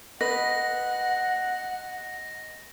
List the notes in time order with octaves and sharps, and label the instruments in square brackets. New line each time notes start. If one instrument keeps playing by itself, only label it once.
[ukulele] B4 [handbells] D#5 [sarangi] F#5 [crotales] A#6